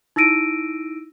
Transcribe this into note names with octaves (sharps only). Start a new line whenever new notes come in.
D#4 E4 E6 A#6 D7 D#7